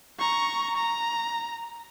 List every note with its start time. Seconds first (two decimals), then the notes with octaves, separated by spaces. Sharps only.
0.19 A#5 C#6
0.76 A#5